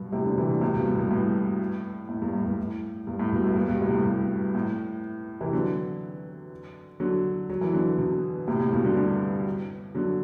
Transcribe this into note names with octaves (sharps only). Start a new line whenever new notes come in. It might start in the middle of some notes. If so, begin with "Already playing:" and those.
Already playing: G2 B2
A2 C3
B2 D3
C3 E3
B2 D3
A2 C3
G2 B2
A2
G2 B2
A2
A2
G2
A2
G2
A2
G2
A2
G2 B2
A2
G2
G2 B2
A2 C3
A2
G2
A2
C3 E3
D3 F#3
D3 F#3
F#3
E3
D3 F#3
B2 D3
A2 C3
A2
G2 B2
B2 D3
B2 D3
D3 F#3